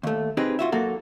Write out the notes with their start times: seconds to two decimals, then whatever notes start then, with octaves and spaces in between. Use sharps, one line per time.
0.03 D#2 A3
0.37 C4 D#4 G4 G#4 B4
0.59 F4 F#4 E5
0.72 F#3 A#3 F#4 A4